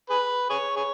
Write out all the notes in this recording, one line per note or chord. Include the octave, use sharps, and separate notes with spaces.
G#4 B4
G#4 C#5
G#4 C#5